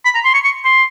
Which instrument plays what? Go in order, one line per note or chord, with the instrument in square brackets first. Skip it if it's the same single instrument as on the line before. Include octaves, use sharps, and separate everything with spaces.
[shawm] B5
A#5
C6
C#6
C#6
C6